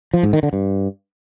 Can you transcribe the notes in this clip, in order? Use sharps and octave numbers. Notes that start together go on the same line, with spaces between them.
F3
G#2
D#3
D3
G2